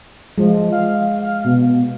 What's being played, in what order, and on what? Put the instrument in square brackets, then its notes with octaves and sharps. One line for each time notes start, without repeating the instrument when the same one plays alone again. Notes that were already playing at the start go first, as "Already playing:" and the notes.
[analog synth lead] F3 [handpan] G#3
[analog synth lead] F5
F5
B2